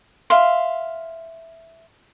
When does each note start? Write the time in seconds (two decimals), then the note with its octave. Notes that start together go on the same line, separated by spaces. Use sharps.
0.30 E5 F5 C6